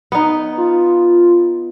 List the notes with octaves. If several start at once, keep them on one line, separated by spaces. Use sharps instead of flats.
B3 D#4
F4